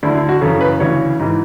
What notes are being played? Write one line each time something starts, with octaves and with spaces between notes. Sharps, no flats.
D2 D3 E4
E4
F#4
F#2 C#3 E3 A4
B4
D2 C#3 E3 C#5
G#2 E3